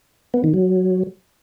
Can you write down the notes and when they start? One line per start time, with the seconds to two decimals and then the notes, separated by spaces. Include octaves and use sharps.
0.34 B3
0.44 D#3
0.54 F#3